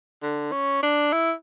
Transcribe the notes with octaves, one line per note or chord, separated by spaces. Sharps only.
D3
C#4
D4
E4